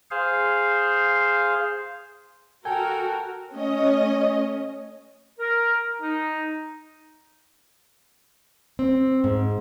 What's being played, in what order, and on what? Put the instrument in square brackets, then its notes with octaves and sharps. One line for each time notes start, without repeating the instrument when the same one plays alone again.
[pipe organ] G#4 C5 F5
[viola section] F#4 A#4 [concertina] A4 [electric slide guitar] G5 [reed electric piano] G#5
[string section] A3 C#4 C#5 D#5
[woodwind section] A#4
D#4
[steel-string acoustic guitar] C4
G#2